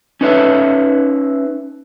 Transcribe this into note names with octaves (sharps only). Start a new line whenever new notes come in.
C#4 D#4 B4 C#5 E5